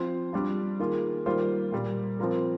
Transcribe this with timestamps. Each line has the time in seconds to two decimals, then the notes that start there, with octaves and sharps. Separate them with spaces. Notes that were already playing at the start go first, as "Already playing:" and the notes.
Already playing: F3 C4 F4 C5
0.33 G3 D4 F4
0.80 D#3 A#3 F4 G#4
1.26 D#3 G3 A#3 F4 C5
1.72 A#2 G3 A#3
2.19 F3 C4 F4 A#4